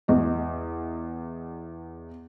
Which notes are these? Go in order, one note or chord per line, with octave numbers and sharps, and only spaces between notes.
E2 D#5